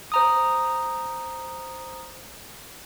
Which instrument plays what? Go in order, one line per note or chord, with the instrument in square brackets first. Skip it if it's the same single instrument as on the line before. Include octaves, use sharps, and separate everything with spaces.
[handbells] C5 A#5 D#6